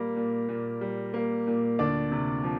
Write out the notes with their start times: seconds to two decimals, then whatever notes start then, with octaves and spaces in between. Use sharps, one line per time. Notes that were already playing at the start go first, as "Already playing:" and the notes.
Already playing: A#2 G3 A#3
0.16 A#2
0.49 A#2
0.81 G3
1.14 A#3
1.47 A#2
1.79 D2 D4 D5
2.12 C3
2.44 F3